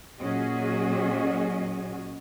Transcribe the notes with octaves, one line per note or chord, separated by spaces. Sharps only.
A#2 F#3 C#4 F#4 G#4 D#5